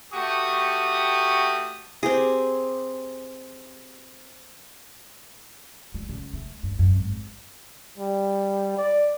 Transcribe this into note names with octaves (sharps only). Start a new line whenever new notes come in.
A3 F#4 G4 C#6 D#6
C4 G4 G#4
G3
C#3
A3
G2
F#2
G#1
G3
D5